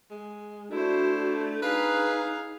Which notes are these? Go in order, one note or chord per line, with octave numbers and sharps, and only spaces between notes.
G#3
A3 D4 E4 F#4 C5
D#4 G#4 B4 F5